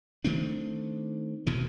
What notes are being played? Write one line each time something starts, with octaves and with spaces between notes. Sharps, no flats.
D#3 A3 C4 D4
E1 D2 B2 E3